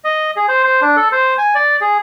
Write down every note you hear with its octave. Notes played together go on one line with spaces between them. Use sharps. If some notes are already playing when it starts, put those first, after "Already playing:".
D#5
G#4
C5
C5
D4
A4
C5
G#5
D5
G#4